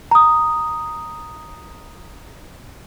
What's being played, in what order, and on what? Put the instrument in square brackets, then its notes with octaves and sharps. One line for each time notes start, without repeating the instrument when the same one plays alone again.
[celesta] A#5 D#6